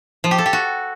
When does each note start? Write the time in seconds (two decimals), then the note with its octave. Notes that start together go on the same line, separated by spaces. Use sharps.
0.24 F3
0.31 G4
0.38 A4
0.46 G4
0.53 F#4